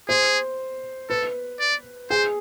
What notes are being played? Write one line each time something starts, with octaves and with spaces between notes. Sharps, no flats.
G#4 C5
A4 B4
D5
G#4 C5